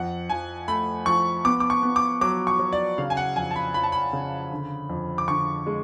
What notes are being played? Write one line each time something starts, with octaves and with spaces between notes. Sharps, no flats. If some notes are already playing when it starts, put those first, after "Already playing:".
Already playing: F2 F#5
F3 G#5
A3 B5
F3 C#6
B3 D6
D6
C#6
B3
D6
F#3 D6
C#6
F#3
D5
C#3 F5
G#5
F#5
F2 G#5
A5
B5
F3 B5
A5
B5
C#3
D3
F2
D6
D3 C#6
G#3